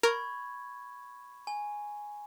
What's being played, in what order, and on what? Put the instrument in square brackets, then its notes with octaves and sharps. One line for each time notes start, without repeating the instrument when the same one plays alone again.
[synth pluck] A#4 [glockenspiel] B5 C#6 G#6
[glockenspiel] G#5